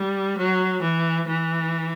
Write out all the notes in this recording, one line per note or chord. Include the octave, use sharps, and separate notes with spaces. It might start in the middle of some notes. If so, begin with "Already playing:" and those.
Already playing: G3
F#3
E3
E3